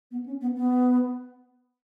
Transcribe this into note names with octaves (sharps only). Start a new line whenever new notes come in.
B3
C#4
B3
B3